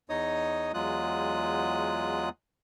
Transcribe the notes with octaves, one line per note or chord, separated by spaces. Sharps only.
E2 D#4 C#5 D#5 D#6
E2 F#3 G#3 F4 D#6 F#6